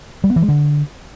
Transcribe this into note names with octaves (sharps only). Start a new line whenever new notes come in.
G3
B3
E3
G#3
D3